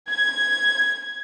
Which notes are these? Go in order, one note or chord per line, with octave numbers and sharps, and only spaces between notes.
G#6